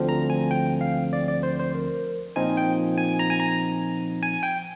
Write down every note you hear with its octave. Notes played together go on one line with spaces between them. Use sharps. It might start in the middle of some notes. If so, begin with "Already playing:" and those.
Already playing: D2 D3 F3 C4
A#5
G#5
G5
F5
D5
D5
C5
C5
A#4
A#2 F3 C4 D#4 G#5
G5
G#5
A#5
G#5
A#5
G#5
G5